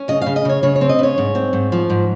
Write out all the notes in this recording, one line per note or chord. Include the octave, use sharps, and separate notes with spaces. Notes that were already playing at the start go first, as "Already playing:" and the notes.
Already playing: C#4
C#3 D#5
C#3 F5
D#5
C#3 C#5
C#3 C#5
C#5
C4
D#5
C#3 C#5
G#2
C4
G#2
F3
G#2